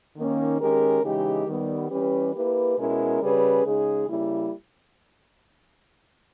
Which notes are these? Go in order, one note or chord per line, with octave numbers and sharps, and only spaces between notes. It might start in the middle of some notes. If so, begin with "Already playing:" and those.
D#3 A#3 C#4
D#3 G#3 C#4 G4 A#4
C#3 E3 G#3 D#4 G4
D#3 G3 B3
E3 G3 C#4 G4 B4
A#3 E4 G4 B4
B2 G#3 C#4 E4 A#4
C#3 G3 C#4 G#4 B4
C#3 G#3 D#4 G#4
C#3 G3 A#3 E4